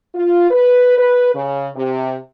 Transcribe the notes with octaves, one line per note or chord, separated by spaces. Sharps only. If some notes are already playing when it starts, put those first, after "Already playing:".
F4
B4
B4
C#3
C3